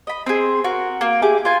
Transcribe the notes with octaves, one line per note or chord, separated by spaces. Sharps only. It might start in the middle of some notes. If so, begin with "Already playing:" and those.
D#5 B5
C4 G#4
F#4 A#4
A#3
E4 G4 G#4 D6
F4 G#5